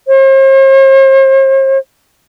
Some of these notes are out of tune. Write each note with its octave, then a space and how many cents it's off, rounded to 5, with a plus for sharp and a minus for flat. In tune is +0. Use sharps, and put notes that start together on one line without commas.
C5 +45